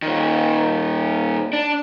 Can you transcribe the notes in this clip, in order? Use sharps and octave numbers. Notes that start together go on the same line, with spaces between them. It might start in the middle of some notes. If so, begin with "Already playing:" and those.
A#2 D#3
D4